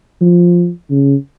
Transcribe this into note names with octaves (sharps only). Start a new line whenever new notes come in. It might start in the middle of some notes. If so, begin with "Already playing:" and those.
F3
C#3